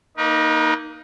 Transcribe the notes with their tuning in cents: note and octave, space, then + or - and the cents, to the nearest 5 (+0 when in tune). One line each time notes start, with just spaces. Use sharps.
A#3 +0 D#4 +0 B4 -40